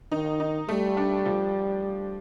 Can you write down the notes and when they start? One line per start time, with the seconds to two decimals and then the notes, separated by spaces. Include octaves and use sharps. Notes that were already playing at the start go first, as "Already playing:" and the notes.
0.12 D#3 D#4
0.40 D#4
0.69 G3 A3
0.97 D4
1.26 F3